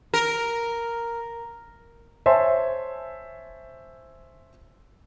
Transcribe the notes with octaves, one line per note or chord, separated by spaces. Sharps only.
A#4
C5 C#5 E5 G#5 A5 C6